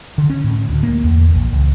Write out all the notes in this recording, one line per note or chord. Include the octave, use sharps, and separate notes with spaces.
D3
C#4
A2
D2
A#3
E2
A#1
C#2